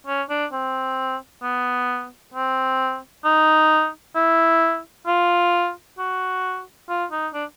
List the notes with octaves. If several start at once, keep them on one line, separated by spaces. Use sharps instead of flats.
C#4
D4
C4
B3
C4
D#4
E4
F4
F#4
F4
D#4
D4